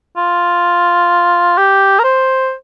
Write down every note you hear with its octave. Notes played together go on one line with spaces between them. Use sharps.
F4
G4
A#4
C5